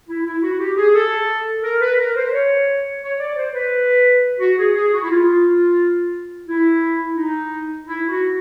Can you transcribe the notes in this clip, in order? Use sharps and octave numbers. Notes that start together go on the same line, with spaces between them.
E4
E4
F#4
G4
G#4
A4
A#4
B4
A#4
C5
C#5
C#5
D5
C5
B4
F#4
G#4
G#4
F#4
E4
F4
E4
D#4
E4
F#4